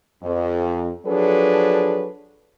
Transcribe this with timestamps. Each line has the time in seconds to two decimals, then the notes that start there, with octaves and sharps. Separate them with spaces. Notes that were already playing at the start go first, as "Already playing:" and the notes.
0.23 F2
1.06 F3 F#3 D4 G#4 A4 B4